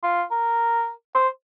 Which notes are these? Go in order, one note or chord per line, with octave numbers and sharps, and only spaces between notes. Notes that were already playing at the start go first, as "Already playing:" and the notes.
F4
A#4
C5